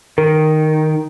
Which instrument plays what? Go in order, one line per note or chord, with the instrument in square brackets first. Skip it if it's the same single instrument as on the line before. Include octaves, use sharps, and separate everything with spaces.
[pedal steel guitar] D#3 [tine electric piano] A#4